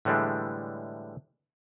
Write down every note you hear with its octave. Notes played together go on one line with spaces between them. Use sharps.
A2 D3 E3 G3 G#3 D4